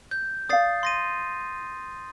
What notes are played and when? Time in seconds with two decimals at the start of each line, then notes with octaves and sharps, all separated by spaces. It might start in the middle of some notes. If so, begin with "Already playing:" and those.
0.11 G6
0.49 D5 F5 D#6 A6 C7
0.83 C6 A#6 D#7